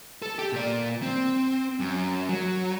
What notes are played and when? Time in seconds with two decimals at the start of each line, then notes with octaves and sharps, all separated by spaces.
0.22 A4
0.39 G4
0.53 A#2 D5
1.02 C4
1.80 F#2
2.29 F#3